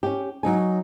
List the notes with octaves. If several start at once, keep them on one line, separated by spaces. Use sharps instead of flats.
C#4 G4
F#3 D#4 G#5